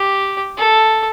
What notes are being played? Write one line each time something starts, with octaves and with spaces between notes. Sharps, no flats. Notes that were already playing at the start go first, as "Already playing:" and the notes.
Already playing: G4
A4